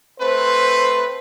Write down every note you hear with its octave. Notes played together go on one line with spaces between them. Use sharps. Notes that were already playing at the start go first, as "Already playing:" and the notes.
A3 C4 B4 C5